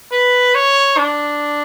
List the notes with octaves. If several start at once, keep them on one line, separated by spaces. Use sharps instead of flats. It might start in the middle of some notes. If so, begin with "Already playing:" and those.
B4
C#5
D4